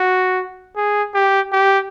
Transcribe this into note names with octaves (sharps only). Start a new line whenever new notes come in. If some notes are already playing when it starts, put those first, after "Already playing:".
Already playing: F#4
G#4
G4
G4